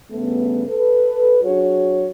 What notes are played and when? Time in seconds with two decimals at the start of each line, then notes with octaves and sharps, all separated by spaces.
0.11 G2 C#3 A3 B3
0.68 A4 B4
1.43 F#3 D4 F#4 G#4 C#5